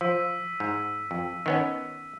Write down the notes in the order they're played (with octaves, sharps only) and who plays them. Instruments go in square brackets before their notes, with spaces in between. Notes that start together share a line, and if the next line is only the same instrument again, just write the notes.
[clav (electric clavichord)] F3 [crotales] E6 B6 D#7
[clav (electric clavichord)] G#2
F2
D#3 B3 C#4